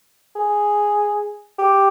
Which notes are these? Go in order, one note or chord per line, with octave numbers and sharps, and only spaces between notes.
G#4
G4